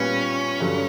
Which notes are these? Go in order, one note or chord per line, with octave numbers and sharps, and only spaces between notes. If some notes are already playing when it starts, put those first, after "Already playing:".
Already playing: A#2 G3 B3 C#4
G2 D3 F#3